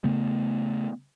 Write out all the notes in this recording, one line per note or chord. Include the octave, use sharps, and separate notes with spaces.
C#3 A3 B3